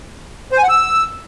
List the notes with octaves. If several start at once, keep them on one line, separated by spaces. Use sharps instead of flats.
C5
G#5
F#5
E6